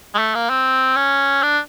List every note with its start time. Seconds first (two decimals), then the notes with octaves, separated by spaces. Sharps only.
0.15 G#3
0.18 A3
0.35 A#3
0.50 C4
0.96 C#4
1.43 D4